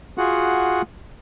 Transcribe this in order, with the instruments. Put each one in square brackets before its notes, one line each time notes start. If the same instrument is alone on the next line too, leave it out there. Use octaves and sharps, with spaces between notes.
[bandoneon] F4 F#4 G#4 F#5